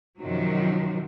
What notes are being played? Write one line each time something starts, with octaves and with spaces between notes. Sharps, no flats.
F#2 C3 D#3 F3 F#3